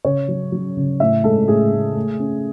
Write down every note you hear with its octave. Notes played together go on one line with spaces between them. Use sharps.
C#3 C#5
F#3
F#3
C#3
A2 E5
G#3 A4
A2 G#4
A2
A3
C#4